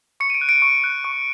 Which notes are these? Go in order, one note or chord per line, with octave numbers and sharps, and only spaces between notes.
C#6 C#7
D#7
D7
F#6
D7
C#6
F#6
C#6